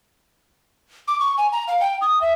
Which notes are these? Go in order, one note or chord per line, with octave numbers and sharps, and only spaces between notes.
D6
C#6
G#5
A#5
F5
G5
D#6
E5